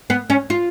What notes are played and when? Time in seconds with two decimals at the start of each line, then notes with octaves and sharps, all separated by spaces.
0.10 B3
0.30 C#4
0.50 F4